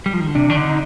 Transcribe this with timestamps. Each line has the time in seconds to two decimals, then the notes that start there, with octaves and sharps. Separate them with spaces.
0.06 G3
0.13 F3
0.20 D#3
0.28 D3
0.35 C3 D4
0.50 D#3
0.56 D3 D#4